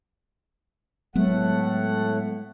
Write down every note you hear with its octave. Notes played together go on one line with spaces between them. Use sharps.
A2 F#3 G#3 A3 B3 F#5